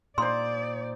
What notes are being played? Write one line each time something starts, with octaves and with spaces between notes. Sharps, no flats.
A#2 D#4 C5 D5 C6